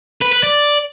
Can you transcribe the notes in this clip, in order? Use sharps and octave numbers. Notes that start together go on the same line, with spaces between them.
B4
B4
D5